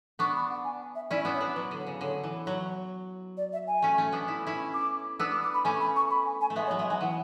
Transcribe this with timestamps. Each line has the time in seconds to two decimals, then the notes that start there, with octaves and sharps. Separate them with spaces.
0.19 B3 D4 C#6
0.35 B5
0.50 F#5
0.64 G#5
0.95 E5
1.10 C#4 E4 D5
1.25 B3 D4
1.33 C#5
1.40 B3 D4
1.55 F#3 B4
1.71 D3
1.79 C#5
1.87 C#3
2.01 D3 C#5
2.24 E3
2.46 F#3 C#5
3.37 D5
3.53 E5
3.67 G#5
3.82 A3 C#4
3.98 A3 C#4
4.12 B3 D4
4.28 E4
4.47 C#4 E4
4.74 D6
5.19 B3 D4 E6
5.31 D6
5.43 D6
5.53 B5
5.64 A3 C#4 G#5
5.80 B5
5.96 C#6
6.10 B5
6.26 G#5
6.41 G#5
6.50 A3
6.56 G#3 B3 E5
6.67 C#5
6.71 F#3
6.79 G#3 E5
6.90 F#3 G#5
7.01 E3 F#5